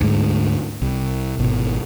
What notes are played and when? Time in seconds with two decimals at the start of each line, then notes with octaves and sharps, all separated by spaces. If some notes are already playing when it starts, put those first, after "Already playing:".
0.01 D2 G#2 G#3
0.82 C2
1.39 G#1 B2